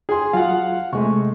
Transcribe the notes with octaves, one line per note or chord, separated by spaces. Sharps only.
G#4 G#5 C6
F#3 F4 F5 F#5
C3 G#3 A3 C#6